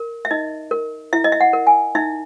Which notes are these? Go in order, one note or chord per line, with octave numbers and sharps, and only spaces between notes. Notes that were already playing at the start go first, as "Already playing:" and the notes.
Already playing: A#4
E5
D#4 D#5
A#4
E4 E5
D#5
E5
F#5
A#4
G#5
D#4 E5